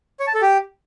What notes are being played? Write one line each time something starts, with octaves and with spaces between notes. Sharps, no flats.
C#5
A5
A4
G4